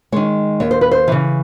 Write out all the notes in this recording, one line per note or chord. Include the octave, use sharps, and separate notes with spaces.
D#3 G#3 C#5
D#2 C#5
C5
B4
C5
C#3 E3